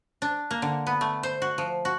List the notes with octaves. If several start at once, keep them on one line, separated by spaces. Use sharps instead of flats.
D4
A#3
D3
B3
A3
C5
F#4
F3
F#4